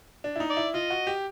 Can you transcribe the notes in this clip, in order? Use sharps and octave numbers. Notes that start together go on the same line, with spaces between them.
D4
E4
D#4
D5
E4
F4 D#5
F#4
G4